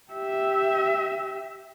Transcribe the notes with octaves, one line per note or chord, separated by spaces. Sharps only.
G4 E5